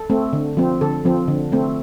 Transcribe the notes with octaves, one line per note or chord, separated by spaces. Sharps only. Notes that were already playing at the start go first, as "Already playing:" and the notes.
Already playing: A4
A3 C4
D3
F3 C4
D3 A4
F3 C4
D3
A3 C4